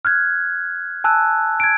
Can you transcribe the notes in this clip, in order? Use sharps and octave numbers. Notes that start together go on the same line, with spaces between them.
F6 F#6 G#6
G#5 A5 E6 F#6
G#6 D7